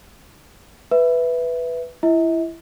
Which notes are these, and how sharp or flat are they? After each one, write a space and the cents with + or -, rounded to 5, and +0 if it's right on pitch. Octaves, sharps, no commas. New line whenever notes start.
B4 +0 E5 +0
E4 +20 E5 -45